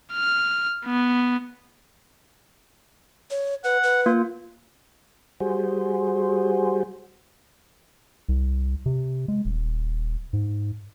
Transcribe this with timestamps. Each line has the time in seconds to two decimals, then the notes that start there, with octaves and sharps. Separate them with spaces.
0.13 F6
0.85 B3
3.31 C#5
3.64 B4 F#5
3.83 B4
4.06 A#3 F4
5.40 G3 F#4 G#4 C5
8.29 C2
8.86 C3
9.28 G#3
9.45 D#1
10.33 G#2